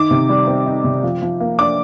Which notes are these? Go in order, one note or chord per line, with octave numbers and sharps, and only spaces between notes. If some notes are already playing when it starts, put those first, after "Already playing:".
Already playing: D#3 D#4 D6
C3
G3
C4
D#4
C3
F3
F3
A#3
D4 D6